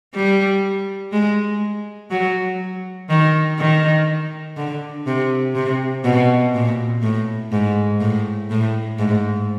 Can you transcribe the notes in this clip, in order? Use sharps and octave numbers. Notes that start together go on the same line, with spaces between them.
G3
G#3
F#3
D#3
D#3
D3
C3
C3
B2
A#2
A2
G#2
A2
A2
G#2